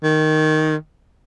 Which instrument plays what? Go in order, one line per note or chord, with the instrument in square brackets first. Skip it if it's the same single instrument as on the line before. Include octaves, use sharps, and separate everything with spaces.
[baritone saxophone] D#3